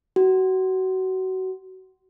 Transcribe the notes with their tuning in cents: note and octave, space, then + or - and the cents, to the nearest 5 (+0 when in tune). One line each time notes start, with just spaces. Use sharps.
F#4 +25